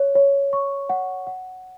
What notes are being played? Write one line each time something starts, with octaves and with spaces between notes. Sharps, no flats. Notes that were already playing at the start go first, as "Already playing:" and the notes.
Already playing: C#5
C#5
C#6
F#5
F#5